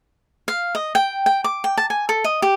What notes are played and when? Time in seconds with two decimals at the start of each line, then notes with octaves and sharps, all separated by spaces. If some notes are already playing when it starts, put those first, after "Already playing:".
0.48 F5
0.75 D#5
0.95 G5
1.26 G5
1.44 D6
1.64 G5
1.77 A5
1.90 G#5
2.09 A4
2.24 D#5
2.42 G4